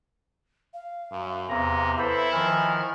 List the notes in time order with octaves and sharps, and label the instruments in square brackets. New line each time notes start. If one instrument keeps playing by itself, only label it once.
[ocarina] F5
[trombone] F#2
[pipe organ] E2 A#5 [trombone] C3
[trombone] E4 [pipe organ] A4 C5 B5 [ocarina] B4
[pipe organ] D#3 F3 F6 [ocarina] G#5